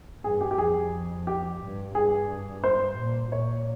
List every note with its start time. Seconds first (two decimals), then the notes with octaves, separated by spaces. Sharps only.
0.24 G2 G#4
0.41 G4
0.51 G4
0.58 F2 G#4
1.27 G4
1.61 G2
1.95 G2 G#4
2.64 C5
2.97 A#2
3.32 A#2 C#5